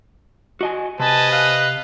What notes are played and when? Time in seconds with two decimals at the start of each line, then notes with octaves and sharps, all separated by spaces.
0.61 F#4 D#5 G#5
0.99 C3 B4 D#5 G#5 A5
1.32 F5 F#6